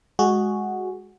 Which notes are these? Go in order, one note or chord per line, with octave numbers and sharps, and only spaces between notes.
G#3 F#4 G#4